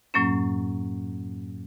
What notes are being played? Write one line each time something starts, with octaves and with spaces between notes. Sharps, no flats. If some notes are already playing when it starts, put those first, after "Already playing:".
F#2 A2 F#3 A#3 C#4